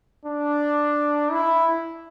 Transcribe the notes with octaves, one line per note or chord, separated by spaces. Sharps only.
D4
E4